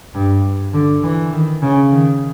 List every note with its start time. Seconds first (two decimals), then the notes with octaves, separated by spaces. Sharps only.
0.15 G2
0.74 D3
1.03 E3
1.32 D#3
1.62 C#3
1.91 D#3